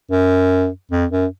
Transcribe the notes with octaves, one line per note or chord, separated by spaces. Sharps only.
F#2
F2
F#2